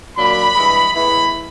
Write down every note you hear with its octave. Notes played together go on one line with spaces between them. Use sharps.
A#2 F#3 A#3 D4 B5
G2 E3 G#3
A2 E3 G#3 B3 E4 B5